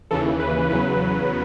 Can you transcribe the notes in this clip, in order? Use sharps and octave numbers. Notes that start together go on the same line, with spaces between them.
D#2 C#3 E3 A4
B4
E2 C#3 F#3 B4